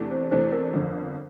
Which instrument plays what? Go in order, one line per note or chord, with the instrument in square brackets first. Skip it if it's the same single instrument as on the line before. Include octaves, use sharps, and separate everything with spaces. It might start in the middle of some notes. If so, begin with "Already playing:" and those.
Already playing: [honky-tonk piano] E2 C3 E3 A3 D4
[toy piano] C5
[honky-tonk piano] E2 C3 E3 A3 D4 [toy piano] C5
[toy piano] A#4
[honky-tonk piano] G1 F2 D3